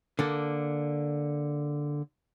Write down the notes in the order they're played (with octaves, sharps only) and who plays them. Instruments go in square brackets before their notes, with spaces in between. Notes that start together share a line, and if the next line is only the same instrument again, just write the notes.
[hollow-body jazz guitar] D3 A#3 A4